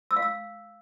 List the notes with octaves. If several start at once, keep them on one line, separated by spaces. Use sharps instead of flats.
E6
F5
E6